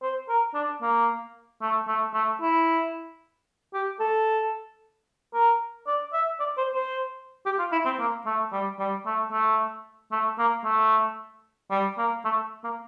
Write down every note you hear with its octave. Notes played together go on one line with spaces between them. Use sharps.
C5
A#4
D4
A#3
A3
A3
A3
E4
G4
A4
A#4
D5
E5
D5
C5
C5
G4
F4
E4
C4
A#3
A3
G3
G3
A3
A3
A3
A#3
A3
G3
A#3
A3
A#3